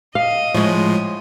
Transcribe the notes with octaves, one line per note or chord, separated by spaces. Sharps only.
D#5 F5
A2 F3 G#3 C#5